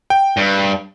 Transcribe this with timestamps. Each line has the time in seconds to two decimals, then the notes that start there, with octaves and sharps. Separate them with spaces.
0.10 G5
0.37 G2